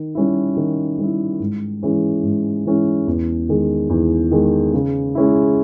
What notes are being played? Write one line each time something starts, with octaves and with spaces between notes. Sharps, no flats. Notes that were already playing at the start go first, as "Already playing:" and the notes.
Already playing: D#3
G3 C#4 E4
D#3
G3 C#4 E4
G#2
E3 G#3 C#4 E4
G#2
E3 G#3 C#4 E4
E2
D#3 G#3
E2
D#3 G#3
C#3
G#3 C#4 E4